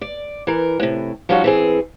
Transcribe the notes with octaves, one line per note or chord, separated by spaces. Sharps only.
D5
E3 A#4
A2 C3
F3 G3 C#4 D#4 F4 F#4
E3 C4 G#4